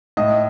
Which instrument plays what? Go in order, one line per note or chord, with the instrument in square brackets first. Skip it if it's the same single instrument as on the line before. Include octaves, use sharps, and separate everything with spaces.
[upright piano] A2 D#5